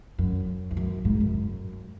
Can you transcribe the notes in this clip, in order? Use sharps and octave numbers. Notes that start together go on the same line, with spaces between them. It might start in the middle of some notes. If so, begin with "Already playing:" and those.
F#2
E2
F#2
G#2
F#2